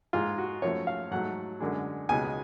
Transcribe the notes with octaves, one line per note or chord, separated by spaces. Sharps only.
G#2 G#3 F4
F#4
F#2 F3 A3 C#5
F5
G#2 F#3 A3 F#5
F#2 D3 G#3
C#2 B2 G#3 G#5